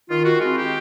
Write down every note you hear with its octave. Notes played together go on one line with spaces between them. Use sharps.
D#3 F4
F#4
G#3 C4 E4 F4
G4